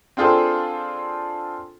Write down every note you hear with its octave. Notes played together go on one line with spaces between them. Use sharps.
C4 D4 F4 G#4 A4 C5